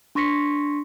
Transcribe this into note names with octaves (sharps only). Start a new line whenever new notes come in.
D4 C6 C#6 A#6 B6 C#7